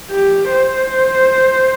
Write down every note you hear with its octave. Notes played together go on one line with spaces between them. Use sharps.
G4
C5